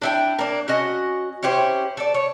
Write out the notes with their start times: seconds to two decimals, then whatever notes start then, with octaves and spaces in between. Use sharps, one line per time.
0.02 D4 E4 G5
0.39 A#3 D4
0.68 C#4 F#4 D#5
1.43 C#4 E4 G4 C5
1.97 A4 D5
2.14 C#5